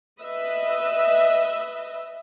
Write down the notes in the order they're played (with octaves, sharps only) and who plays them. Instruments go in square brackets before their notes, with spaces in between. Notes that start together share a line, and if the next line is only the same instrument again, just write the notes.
[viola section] B4 D#5 E5